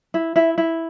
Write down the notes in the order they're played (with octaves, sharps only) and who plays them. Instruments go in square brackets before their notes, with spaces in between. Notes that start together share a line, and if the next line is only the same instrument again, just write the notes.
[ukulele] E4
E4 E5
E4